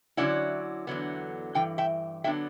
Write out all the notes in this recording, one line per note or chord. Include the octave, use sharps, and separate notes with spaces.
D3 F#3 C#4 E4 D5 F#5
E2 D3 F#3 B3
G2 E3 G5
E5 G5
D3 F#3 B3 D4 E5 G5